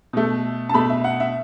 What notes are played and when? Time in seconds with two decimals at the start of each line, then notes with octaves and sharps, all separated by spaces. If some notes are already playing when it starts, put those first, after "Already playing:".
0.13 B2 A3
0.69 A5
0.74 B2 A3 B5
0.90 E5
1.04 F#5
1.20 E5